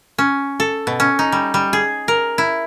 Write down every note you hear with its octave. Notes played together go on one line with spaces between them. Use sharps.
C#4
A4
B2
C#4
D#4
G3
G3
G#4
A#4
E4